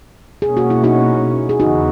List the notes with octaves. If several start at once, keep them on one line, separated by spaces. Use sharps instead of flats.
B2 A#3 C#4 G#4
F#4
E4
D#4 F#4
G#4
E2 C#3 E3 D#4 F#4